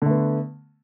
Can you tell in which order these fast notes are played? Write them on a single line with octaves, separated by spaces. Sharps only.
D3 A3 B3